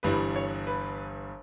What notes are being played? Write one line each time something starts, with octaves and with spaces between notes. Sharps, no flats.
G1 G2 E3 G3 B4
C#5
B4